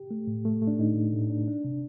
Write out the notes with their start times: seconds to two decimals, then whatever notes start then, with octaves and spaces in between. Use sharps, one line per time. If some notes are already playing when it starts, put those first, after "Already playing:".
Already playing: G4
0.11 A3
0.27 A2
0.45 A3
0.62 A3
0.67 D4
0.79 A2 D#4
0.96 A2
1.13 A2
1.30 D4
1.47 D4
1.64 C3